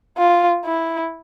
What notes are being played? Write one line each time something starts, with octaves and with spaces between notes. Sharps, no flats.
F4
E4